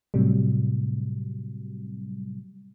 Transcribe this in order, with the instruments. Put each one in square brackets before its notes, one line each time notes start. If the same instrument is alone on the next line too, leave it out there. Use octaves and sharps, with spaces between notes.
[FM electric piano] A2 C3 F#3 G3